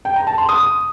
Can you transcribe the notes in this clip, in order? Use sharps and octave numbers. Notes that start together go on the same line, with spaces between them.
G5
A#5
A5
C6
D#6